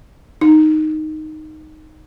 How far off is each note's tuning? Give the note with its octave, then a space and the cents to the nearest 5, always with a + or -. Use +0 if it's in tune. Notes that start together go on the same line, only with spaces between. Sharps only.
D#4 -5